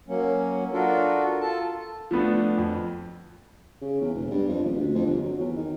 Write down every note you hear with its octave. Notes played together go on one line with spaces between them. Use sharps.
F#3 A#3 C#4
D4 F4 F#4 A4 A#4
F4 A4 A5
F3 A3 B3 D4
F2
C#3
E2
E1
G2
F2
D#1
D2
F2
G1
F#3
E2
D#3